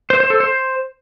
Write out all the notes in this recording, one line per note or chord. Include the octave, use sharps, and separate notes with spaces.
C5
C5
A4
C5